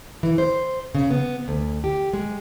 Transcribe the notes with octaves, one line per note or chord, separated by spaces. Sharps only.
E3
C5
C#3
B3
D2
G4
G#3